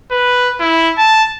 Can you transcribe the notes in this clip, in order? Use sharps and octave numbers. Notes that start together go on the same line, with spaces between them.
B4
E4
A5